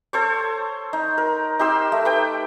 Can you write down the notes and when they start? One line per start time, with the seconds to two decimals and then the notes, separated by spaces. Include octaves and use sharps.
0.13 A4 C5 C#5
0.93 D#4
1.18 A#4
1.59 D#4 G4 C6 E6
1.92 A3
2.05 B4 G5